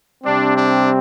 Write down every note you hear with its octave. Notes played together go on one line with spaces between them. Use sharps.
C3 G3 C4 D4
D4